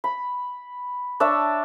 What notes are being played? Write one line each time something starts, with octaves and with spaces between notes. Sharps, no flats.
B5
D4 C#5 E5 A5